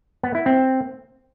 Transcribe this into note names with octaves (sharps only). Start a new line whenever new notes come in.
B3
E4
C4